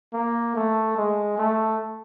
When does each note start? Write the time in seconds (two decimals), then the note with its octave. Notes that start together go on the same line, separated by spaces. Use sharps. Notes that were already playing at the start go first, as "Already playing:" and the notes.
0.13 A#3
0.55 A3
0.97 G#3
1.38 A3